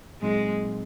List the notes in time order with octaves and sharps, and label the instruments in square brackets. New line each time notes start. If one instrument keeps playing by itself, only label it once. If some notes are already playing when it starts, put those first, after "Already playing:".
[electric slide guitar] A#2 F#3 C4 D#4 [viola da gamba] G#3